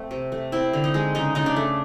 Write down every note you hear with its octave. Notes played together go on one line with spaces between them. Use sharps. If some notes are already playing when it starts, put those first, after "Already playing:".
Already playing: A3 C4
C3
A3
C4 E4
D3
D#4
G#3
C#3 D#4
C#3 D#4
D4
A3